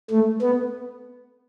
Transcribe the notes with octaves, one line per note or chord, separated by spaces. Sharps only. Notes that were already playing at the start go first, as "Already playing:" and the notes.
A3
B3